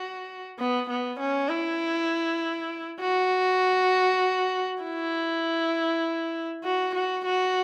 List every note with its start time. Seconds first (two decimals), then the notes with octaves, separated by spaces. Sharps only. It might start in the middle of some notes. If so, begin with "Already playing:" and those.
Already playing: F#4
0.59 B3
0.89 B3
1.20 C#4
1.49 E4
3.00 F#4
4.83 E4
6.64 F#4
6.95 F#4
7.25 F#4